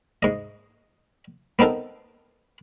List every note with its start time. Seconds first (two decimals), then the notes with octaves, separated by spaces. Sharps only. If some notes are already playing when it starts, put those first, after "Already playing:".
0.23 G#2 D#5
1.59 B3 C4 D#4 A4 A#4